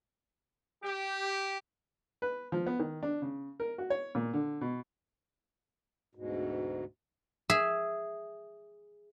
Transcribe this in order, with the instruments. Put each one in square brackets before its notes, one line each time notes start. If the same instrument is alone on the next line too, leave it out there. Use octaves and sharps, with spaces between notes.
[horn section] G4
[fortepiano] B4
F3
B3
D#3
D4
C#3
A#4
F#4
C#5
A#2
D3
B2
[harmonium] D2 G#2 B2
[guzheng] G#4 E5